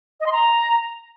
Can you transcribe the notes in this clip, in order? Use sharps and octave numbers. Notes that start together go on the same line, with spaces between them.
D#5
C6
A#5